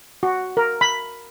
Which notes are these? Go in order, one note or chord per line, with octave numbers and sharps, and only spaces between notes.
F#4
A#4
B5